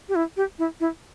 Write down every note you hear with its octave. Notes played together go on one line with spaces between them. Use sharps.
G4
E4
G4
E4
E4